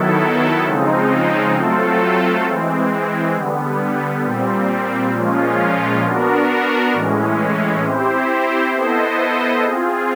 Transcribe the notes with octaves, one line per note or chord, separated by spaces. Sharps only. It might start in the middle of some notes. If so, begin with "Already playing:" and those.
Already playing: D#3 F#3 B3 E4 A4
C#3 F3 G#3 C4 D#4
F#3 A3 C4 F4 A4
E3 G#3 C4
D3 G3 B3
A#2 G3 C4
A#2 F3 G#3 C#4 F4
B3 D4 F#4 A#4
A2 E3 G#3 C#4
C4 E4 G4 C5
B3 E4 A4 C5 D#5
C4 F4 G#4